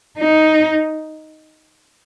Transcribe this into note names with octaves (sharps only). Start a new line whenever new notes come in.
D#4